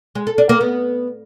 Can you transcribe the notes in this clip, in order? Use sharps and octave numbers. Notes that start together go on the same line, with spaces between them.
G#3
A4
D4
A#3
B3